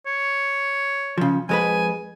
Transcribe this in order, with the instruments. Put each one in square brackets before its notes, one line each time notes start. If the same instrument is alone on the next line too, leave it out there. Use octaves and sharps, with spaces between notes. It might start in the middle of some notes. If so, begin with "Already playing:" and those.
[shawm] C#5
[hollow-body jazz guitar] C#3 F3
[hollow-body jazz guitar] F2 G#3 B4 [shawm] G#5